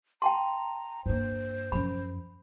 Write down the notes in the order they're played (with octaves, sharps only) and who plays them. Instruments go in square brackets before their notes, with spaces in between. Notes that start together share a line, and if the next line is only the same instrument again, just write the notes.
[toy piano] G5 A5 C6 [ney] A#5
[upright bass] G2 A#3 [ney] C5
[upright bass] F#2 F3 [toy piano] B5